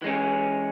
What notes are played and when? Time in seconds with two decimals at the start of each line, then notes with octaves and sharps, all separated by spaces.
0.02 E3 G#3 C#4